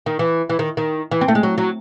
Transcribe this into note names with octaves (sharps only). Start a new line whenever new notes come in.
D#3
E3
E3
D#3
D#3
E3
C4
A3
G#3
F#3
F#3